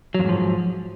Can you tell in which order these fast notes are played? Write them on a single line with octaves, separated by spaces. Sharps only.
F#3 F2 G#2 F3